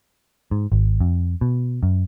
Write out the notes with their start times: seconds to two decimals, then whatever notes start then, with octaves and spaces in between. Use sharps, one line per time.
0.51 G#2
0.72 G#1
1.01 F2
1.41 B2
1.83 F#2